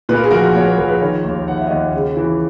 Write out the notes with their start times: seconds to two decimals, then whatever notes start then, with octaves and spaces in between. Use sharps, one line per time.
0.09 A#2 B4
0.16 A#4
0.24 G#4
0.31 A#1 F#4 A#4
0.55 A#2 C#5
0.66 B4
0.77 A#1 A#4
0.88 G#4 B4
1.01 D#3 A#4 C#5
1.24 D#2
1.48 D#3 F#5
1.57 E5
1.66 D#2 D#5 F#5
1.93 C#3
2.17 E3